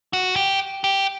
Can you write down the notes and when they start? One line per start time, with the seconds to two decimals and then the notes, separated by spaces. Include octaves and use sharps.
0.13 F#4
0.36 G4
0.84 G4